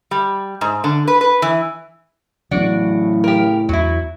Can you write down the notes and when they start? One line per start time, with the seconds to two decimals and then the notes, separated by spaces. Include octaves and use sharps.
0.11 G3
0.61 G#2
0.84 D3
1.08 B4
1.21 B4
1.42 E3
2.51 A2 C#3 E3 F#3 B3 D4 F#4 D5
3.24 G4 A#4
3.69 E2 F#3 E4